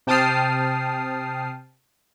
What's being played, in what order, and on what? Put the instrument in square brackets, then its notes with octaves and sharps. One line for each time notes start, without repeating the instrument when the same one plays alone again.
[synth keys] C3 G5 A5 D#6 F6 C7